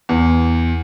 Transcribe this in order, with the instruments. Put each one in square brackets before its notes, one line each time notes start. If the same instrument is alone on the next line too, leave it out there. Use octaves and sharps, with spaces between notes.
[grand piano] E2